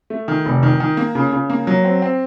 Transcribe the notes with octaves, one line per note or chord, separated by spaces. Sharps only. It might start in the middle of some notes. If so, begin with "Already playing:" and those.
A3
D#3
F1
D#3
D#3
A#3
C#3
C#3
A#3
F#3
C4
C4